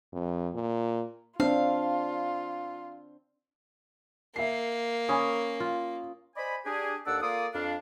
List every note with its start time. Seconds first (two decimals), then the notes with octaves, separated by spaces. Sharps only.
0.13 F2
0.55 A#2
1.40 C4 D4 F4 F5
4.36 A#3 E5 C7
5.09 C#4 G#5 B5 D#6
5.60 F4
6.36 C5 D5 D#5 G#5 B5
6.65 D4 G4 G#4
7.06 D#2 D4 A4 D5 F#5 E6
7.22 A#3 F4 A4 D5 D#6
7.53 F2 D4 F5